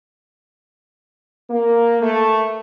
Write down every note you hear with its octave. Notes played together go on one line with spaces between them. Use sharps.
A#3
A3